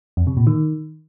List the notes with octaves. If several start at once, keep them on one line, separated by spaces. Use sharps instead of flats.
F2
C3
A#2
D#3